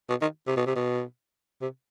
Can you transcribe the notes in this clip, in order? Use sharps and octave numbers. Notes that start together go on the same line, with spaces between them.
B2
D#3
C3
B2
C3
B2
C3